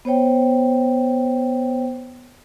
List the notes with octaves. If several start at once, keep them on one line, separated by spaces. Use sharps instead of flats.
B3 C5 C#5 G5